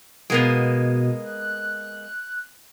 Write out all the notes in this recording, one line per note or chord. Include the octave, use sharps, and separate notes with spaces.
B2 G#3 A#3 B3
F#6